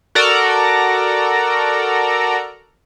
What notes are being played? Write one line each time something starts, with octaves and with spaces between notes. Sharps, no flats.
F#4 A4 A#4 D5 A#5